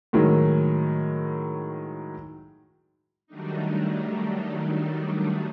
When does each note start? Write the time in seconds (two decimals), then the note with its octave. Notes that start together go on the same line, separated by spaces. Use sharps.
0.13 A2 D#3 F#3 G#3
3.27 D#3 F#3 G3 A3 D4 D#4